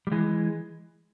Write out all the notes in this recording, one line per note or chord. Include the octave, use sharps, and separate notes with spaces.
G3
E3 G#3